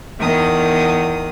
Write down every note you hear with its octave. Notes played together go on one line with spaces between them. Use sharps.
E2 D#3 D#6